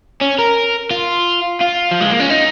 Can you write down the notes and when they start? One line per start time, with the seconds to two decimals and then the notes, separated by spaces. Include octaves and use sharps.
0.21 C#4
0.39 A#4
0.91 F4
1.61 F4
1.91 F3
2.00 G#3
2.11 A#3
2.19 C#4
2.30 D#4